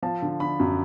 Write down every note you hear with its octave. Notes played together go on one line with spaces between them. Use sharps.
F3 A5
D3
D3 B5
F#2